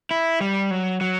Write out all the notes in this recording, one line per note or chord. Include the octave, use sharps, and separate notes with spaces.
E4
G3
F#3
F#3